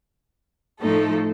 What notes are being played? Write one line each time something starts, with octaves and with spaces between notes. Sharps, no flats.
A2 F3 A3 D#4 A4